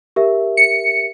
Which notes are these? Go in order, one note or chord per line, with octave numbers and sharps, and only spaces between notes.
G4 A#4 E5
C#7